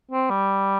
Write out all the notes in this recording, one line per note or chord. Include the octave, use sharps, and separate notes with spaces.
C4
G3